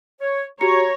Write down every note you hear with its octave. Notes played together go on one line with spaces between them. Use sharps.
C#5
F#4 G4 C#5 A#5 C#7